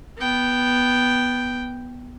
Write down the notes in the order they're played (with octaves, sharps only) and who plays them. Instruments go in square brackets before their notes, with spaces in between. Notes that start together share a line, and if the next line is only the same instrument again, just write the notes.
[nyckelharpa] B3 G5